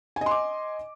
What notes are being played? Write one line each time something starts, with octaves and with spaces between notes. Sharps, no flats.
D#5 G#5 C6 D6